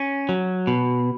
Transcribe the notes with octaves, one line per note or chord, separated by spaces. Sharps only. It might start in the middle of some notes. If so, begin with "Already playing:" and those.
Already playing: C#4
F#3
B2